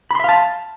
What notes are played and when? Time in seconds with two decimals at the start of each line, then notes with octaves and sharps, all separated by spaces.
0.11 B5
0.15 C6
0.20 E5
0.24 F5
0.29 A5